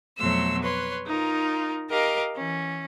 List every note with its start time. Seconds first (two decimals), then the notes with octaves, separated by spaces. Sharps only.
0.17 F2 B2 F#3 A3 C6 E6
0.61 B4 C#5 C6
1.06 D#4 F4 A#4
1.90 G4 A#4 D#5 F5
2.35 E3 C#4